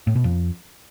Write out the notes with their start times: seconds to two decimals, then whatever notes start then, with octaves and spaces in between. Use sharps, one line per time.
0.07 A2
0.16 B2
0.24 F2